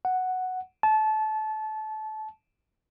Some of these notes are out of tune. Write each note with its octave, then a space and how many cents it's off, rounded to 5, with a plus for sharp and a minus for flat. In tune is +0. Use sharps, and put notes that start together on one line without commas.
F#5 +0
A5 -25